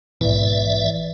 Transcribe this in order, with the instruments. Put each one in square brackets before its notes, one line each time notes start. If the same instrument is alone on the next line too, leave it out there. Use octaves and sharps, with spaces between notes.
[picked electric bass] A#1 G#2 B2 [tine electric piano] E3 [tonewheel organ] D5 E5